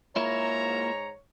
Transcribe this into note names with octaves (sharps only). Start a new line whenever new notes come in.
G#2 A#3 E4 F4 C#5 A#5